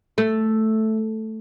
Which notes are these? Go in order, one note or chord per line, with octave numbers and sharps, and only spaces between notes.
A3